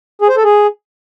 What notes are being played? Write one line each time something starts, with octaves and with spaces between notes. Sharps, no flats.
G#4
C5
A4
G#4